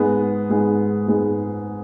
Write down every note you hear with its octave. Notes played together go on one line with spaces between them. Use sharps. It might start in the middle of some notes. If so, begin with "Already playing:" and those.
Already playing: G#2 G#3 B3 G#4
G#2 G#3 B3 G#4
G#2 G#3 B3 G#4